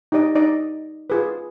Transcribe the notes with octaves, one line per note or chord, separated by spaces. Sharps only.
D#4 G4 D5 D#5
D#4 D5 D#5
F4 G#4 B4